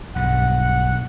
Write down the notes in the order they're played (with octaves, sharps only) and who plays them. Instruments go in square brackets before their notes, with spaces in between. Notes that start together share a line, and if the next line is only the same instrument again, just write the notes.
[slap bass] B1 G2 [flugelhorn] F#5